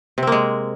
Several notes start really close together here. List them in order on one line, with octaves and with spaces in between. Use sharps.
C3 C4 A#3 G#3